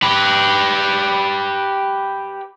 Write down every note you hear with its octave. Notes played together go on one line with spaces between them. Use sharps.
G4 B4